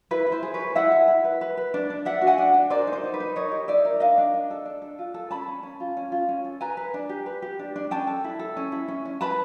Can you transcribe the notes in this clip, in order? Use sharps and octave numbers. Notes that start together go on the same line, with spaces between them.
E4 B4
E4
C5
G#4
B4 C#5
G#4
E4 E5 F#5
G#4
E4
B4
B4
B4
D4
D4
D4 E5 F#5
F#4
F#5 G#5
D4
D4
A#4 C5 D5
D#4
C5
D#4
B4
D#4
A#4 C#5 D#5
G4
D#4 D5 E5
A#4
D4 D#5 F5
D4
D4
A4
D4
A4
F4
A4
C#4 A5 B5
C#4
C#4
F4
C#4
F4
C#4
A4
B4 G#5 A#5
B4
D4
G4
B4
G4
D4
D4
C#4 G5 A5
A4
E4
A4
C#4
E4
C#4
C#4
B4 A5 B5